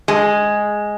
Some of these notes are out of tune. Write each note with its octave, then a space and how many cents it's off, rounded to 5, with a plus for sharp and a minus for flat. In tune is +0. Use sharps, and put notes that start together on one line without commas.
G#3 +0